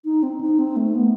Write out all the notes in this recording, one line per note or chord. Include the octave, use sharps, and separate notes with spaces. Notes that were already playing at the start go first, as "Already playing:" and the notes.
D#4
C4
D#4
C4
A3
B3